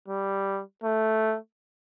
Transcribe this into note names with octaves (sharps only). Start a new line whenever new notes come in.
G3
A3